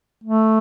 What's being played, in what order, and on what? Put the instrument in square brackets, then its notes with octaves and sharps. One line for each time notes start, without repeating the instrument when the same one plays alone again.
[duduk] A3